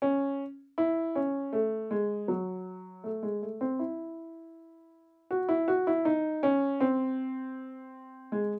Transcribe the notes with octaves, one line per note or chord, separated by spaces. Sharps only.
C#4
E4
C#4
A3
G#3
F#3
A3
G#3
A3
C4
E4
F#4
E4
F#4
E4
D#4
C#4
C4
G#3